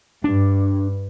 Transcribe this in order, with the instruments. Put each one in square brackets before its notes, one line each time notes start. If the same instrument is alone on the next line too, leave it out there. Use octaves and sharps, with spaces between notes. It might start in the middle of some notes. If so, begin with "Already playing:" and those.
[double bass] G2 [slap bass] D4